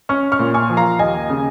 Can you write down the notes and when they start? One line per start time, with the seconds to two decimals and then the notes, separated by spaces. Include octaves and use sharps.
0.09 C#4 C#6 F6
0.32 C#6 F6
0.39 A#2
0.54 G#5 C#6
0.70 F3
0.77 F5 A#5
0.99 D#2 D#5 G#5
1.30 C#3